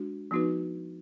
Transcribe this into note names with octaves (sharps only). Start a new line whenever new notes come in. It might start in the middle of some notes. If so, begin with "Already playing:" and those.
Already playing: G#3 D4 F#4
F3 B3 D#4 F#4 B4